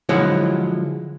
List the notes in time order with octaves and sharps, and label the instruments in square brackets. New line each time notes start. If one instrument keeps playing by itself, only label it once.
[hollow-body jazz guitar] D3 F3 F#3 G#3 E4